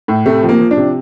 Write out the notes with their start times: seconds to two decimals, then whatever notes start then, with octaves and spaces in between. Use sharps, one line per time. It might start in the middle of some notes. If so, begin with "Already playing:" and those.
0.08 A2
0.25 C3 A3
0.43 F3
0.49 A#3
0.60 F3
0.71 D4
0.77 C3